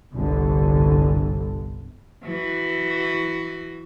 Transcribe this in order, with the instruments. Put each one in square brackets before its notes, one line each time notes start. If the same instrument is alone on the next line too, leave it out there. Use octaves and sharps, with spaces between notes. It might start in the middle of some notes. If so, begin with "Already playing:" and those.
[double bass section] G1 C2 D3
[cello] E3 F#4